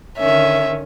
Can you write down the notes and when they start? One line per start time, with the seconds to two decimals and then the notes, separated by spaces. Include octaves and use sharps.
0.18 D3 D#3 C#4 E5